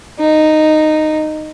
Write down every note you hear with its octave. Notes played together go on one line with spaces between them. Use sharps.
D#4